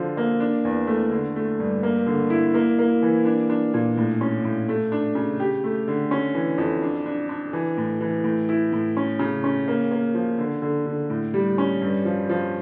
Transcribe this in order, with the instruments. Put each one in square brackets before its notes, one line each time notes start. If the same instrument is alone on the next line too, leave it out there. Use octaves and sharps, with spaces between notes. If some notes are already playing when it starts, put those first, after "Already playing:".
Already playing: [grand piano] D3 F3
A#3
D4
E2
A3
D3
A3
G2
A#3
D3
E4
A#3
A#3
E3
D4
D4
A#2
A2
C#4
A2
A3
D4
C#3
G4
A3
D3
C#4
E3
F2
D4
D4
D4
E3
A2
E3
A2
E4
A2
C#4
C#3
C#4
A#3
A#3
F3
D3
D3
D3
A2
G3
C#4
G2
F3
F3